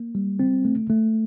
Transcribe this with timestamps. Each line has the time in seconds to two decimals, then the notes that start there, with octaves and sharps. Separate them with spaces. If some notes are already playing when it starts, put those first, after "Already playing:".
Already playing: A#3
0.15 G3
0.39 C4
0.65 A3
0.90 A3